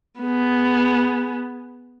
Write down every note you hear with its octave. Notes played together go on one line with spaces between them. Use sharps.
B3 G#4